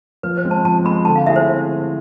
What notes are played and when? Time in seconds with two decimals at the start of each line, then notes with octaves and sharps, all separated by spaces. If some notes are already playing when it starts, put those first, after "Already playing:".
0.23 F3 B4
0.37 C5
0.45 G#3 C4
0.51 A5
0.65 F3 A5
0.84 G#3 B5
0.89 C4
1.05 D3 A5
1.16 F5
1.26 A3 C4 E4 G#4 E5
1.36 C5